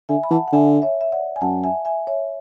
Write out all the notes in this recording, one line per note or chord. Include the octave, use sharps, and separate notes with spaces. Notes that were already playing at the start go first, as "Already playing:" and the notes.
D3 E5 G#5
B5
E3 F#5 A5
F#5
D3 E5 G#5
C#5 E5
E5
D5 F#5
G#5
F#2 F#5 A5
E5 G#5
E5 G#5
C#5 E5